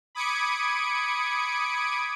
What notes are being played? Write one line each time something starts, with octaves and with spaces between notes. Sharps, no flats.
B5 D6 D#6 G#6 C#7 D7